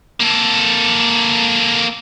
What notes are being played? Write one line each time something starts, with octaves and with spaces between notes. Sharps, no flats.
A#3 A4